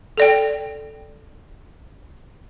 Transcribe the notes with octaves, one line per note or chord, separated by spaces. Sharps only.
A4 D5 G5